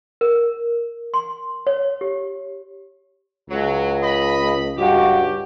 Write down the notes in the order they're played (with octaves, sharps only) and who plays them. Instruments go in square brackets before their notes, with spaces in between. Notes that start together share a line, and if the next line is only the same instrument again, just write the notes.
[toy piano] A#4
C6
C#5
G4
[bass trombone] C#2 [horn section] F#3
[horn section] D#5 B5
[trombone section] C#2 G2 F#4 [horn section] G4